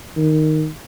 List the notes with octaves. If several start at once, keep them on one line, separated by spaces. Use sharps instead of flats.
D#3